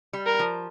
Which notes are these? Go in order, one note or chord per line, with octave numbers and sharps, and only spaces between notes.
G3
A#4
F3